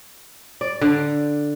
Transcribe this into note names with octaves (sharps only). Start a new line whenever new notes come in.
D5
D3